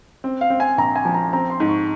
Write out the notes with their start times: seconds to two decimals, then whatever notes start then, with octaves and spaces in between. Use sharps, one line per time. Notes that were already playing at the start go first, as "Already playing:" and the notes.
0.24 C4
0.41 F5
0.50 C4
0.60 G#5
0.78 A#1 A#5
0.96 G#5
1.05 F3
1.14 A#5
1.33 C4 A#5
1.50 C6
1.60 G#2
1.69 C#6